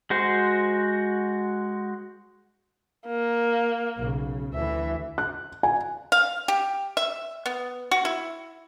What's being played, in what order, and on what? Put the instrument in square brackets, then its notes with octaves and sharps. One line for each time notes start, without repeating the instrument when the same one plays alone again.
[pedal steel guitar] G#3 F#4 C5
[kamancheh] A#3
[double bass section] B1 C#3
[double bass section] D2 E3 [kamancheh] E5
[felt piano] F#6
G#5
[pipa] F5
G4
E5
B3
F#4
E4